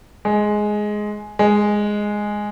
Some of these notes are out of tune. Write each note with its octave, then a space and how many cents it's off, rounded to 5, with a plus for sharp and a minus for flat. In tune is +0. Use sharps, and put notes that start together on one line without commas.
G#3 +10
G#3 +0